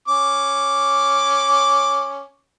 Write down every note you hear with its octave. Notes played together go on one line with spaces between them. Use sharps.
C#4 D6